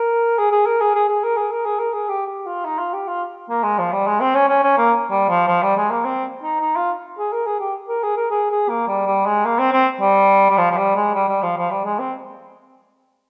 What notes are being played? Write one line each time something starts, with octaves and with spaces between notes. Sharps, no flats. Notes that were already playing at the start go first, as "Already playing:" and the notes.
Already playing: A#4
G#4
G#4
A#4
G#4
G#4
G#4
A#4
G#4
A#4
G#4
A#4
G#4
G4
G4
F4
D#4
F4
G4
F4
A#3
G#3
F3
G3
G#3
C4
C#4
C#4
C#4
A#3
G3
F3
F3
G3
G#3
A#3
C4
D#4
D#4
F4
G#4
A#4
G#4
G4
A#4
G#4
A#4
G#4
G#4
A#3
G3
G3
G#3
A#3
C4
C4
G3
G3
F3
F3
G3
G#3
G3
G3
F3
F3
G3
G#3
C4